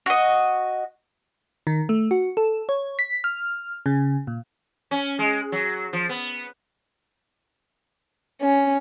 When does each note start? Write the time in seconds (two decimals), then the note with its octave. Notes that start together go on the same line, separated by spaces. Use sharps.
0.06 F#4 D#5
1.67 D#3
1.89 A3
2.11 F#4
2.37 A4
2.69 C#5
2.99 B6
3.24 F6
3.86 C#3
4.27 A#2
4.91 C#4
5.19 G#3
5.52 F#3
5.93 F3
6.09 B3
8.42 C#4